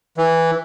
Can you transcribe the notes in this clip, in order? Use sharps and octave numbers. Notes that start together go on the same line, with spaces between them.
E3